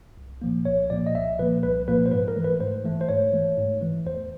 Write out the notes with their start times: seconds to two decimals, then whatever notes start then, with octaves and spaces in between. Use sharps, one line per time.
0.17 C2
0.42 A#2 F3 A#3
0.65 C2 C#5
0.90 A#2 F3 A#3 D5
1.06 D#5
1.14 C2 E5
1.39 A#2 F3 A#3 B4
1.63 C2 B4
1.87 A#2 F3 A#3 B4
2.06 C5
2.12 G#2 B4
2.28 A#4
2.36 E3 A3
2.45 B4
2.60 G#2 C5
2.85 E3 A3
3.01 C5
3.09 G#2 C#5
3.33 E3 A3
3.57 G#2
3.81 E3 A3
4.06 E2 C5